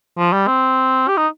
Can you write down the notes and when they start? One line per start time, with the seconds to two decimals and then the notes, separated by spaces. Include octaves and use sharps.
0.18 F3
0.33 G3
0.47 C4
1.08 G4
1.17 D#4